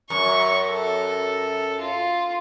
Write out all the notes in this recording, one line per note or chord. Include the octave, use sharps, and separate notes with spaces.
F#2 C#6
A4
F4